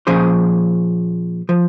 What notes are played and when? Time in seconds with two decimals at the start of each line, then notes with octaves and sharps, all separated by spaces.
0.07 A#2 F3 C#4 G#4 C5
1.49 F3